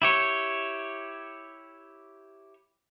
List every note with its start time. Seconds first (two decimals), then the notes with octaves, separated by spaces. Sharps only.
0.02 E4 G4 C#5